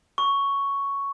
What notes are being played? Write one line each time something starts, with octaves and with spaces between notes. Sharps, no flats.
C#6